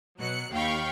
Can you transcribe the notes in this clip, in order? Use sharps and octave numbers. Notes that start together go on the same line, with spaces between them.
B2 F#3 F#6 C#7
D#2 F5 G5 B5 C#6